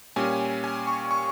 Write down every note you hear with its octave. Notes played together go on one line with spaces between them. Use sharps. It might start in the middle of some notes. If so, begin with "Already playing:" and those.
A#2 G3 C#4 G#5
G#5
C#6
C#6